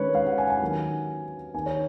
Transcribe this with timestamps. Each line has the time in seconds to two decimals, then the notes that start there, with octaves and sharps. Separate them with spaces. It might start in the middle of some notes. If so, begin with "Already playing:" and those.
Already playing: D#3 G#3 C#4 B4 C#5
0.15 F5
0.27 F#5
0.38 G#5
0.50 G#5
0.62 D#3 F#3 A#3 D#4
1.54 D#3 A#3 D#4 G#5
1.66 C#5